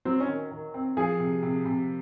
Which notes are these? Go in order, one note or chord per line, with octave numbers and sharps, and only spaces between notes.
F#3 C4
C#4
D#3
D#3
C4
F3 G#4
C3
C3
C3